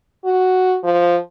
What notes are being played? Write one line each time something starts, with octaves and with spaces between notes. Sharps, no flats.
F#4
F3